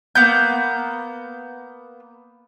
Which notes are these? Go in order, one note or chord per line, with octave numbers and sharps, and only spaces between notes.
A#3 B3 G6